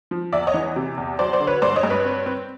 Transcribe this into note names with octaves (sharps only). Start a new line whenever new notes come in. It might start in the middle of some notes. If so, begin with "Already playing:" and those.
F3
E2 D5 E5
C#5 D#5
E3
C3
E2
F#3 C5 D5
C5 D5
D3
B4 C#5
G2 C5 D5
C#5 D#5
G2
B4 C#5
C4
C4